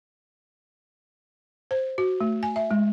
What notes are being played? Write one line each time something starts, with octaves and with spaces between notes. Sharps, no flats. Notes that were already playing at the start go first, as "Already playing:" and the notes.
C5
F#4
A3
G#5
E5
G#3